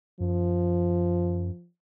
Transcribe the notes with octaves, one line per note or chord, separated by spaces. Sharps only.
F#2 F3